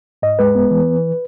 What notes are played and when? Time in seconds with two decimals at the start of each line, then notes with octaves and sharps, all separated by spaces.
0.22 G#2 D#5
0.39 G#3 B4
0.55 B3
0.71 E3